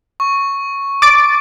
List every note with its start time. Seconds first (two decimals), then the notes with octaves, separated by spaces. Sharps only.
0.20 C#6
1.02 D6 A6 D7